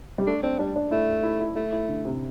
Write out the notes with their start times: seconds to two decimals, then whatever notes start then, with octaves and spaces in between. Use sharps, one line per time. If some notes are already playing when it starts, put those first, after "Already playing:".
0.18 G3
0.27 A3 D4
0.43 C4 D4
0.58 G3 D4
0.76 D4
0.91 A3 E4
1.23 E4
1.40 E4
1.56 A3 E4
1.72 E4
1.88 D3
2.05 C3